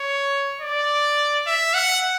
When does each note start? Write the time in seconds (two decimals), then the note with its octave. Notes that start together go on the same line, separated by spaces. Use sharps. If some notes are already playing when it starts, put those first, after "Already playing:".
Already playing: C#5
0.61 D5
1.47 E5
1.74 F#5